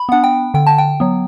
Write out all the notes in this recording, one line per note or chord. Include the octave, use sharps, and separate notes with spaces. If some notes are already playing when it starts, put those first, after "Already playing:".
Already playing: B5
B3 D4 F#5
G5
D3 G5
A5
G5
F#3 B3